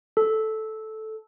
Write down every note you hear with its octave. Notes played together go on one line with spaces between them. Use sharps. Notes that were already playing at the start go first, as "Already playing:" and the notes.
A4